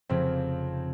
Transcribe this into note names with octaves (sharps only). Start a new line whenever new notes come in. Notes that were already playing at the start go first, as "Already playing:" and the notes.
F1 F2 C#3 F3 C4